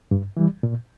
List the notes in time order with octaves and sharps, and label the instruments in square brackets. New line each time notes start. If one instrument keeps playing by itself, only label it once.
[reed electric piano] G2
E3 G3
A#2